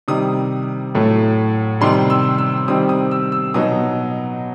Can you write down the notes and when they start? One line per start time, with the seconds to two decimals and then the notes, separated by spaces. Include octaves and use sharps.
0.08 C3 D#3 G3 D#6
0.95 A2 F#3 A3
1.81 C3 D#3 G3 C6
2.10 E6
2.38 E6
2.68 C3 D#3 G3 C4 D#6
2.89 D#6
3.11 E6
3.32 E6
3.54 B2 F#3 B3 D#4 D#6